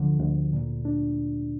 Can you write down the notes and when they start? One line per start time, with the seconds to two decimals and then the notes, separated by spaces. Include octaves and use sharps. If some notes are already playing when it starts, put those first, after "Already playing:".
Already playing: D2 D3 F3
0.20 D2
0.53 A#2
0.85 D4